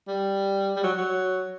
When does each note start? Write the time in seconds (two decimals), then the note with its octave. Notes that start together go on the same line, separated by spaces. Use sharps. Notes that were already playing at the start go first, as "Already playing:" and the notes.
0.07 G3
0.76 G3
0.84 F#3
0.98 F#3